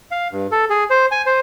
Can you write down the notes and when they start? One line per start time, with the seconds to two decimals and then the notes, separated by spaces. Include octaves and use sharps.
0.11 F5
0.32 G2
0.52 A4
0.70 G#4
0.90 C5
1.11 G#5
1.26 C5